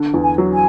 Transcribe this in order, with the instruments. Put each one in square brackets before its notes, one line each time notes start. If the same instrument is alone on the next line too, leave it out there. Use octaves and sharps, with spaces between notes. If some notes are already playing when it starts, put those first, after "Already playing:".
Already playing: [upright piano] D3
E2
[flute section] G#5
[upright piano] F#3
[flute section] G#5